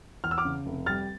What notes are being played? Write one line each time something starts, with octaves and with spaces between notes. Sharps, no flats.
E2 F6
E6
D6 F6
C#3
F1
G3 F6 A6